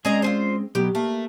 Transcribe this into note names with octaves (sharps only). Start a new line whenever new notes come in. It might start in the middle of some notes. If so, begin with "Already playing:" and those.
G#3 C4 C#4 G#4 D#5 A#5
F4 G#4 C5
B2 F#3 B3 G4
A3 A#3